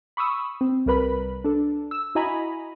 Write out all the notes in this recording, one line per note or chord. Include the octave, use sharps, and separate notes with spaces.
B5 C#6 D#6 E6
C4
C2 G3 A#4 B4 B5
D4 A4
E6
E4 F#4 D#5 G#5 A#5 B5